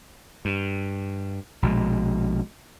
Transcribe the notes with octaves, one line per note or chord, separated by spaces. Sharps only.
G2
A#1 B2 G#3